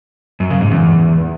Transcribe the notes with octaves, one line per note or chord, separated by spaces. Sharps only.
F#2
C#3
G#2
E2